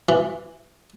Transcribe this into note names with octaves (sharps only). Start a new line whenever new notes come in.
E3